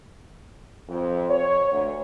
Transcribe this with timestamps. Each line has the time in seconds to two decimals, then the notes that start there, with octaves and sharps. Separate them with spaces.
0.88 F2
1.30 C#5
1.71 D2